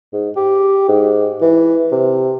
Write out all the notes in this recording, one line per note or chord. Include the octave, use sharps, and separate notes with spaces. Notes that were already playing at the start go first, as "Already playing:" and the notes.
G#2
G4
G#2
E3
C3